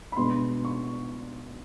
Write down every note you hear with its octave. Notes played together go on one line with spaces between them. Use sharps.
B5
B2 G#3 B3 D4 C6
C#6